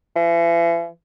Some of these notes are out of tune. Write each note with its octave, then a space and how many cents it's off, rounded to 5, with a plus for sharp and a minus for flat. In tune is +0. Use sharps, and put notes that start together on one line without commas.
E3 +40